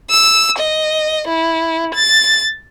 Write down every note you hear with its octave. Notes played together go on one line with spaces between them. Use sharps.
E6
D#5
E4
A6